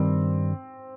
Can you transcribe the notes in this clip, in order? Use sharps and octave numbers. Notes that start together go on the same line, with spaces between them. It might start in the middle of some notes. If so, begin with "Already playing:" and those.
Already playing: G2 D#3 G3 C4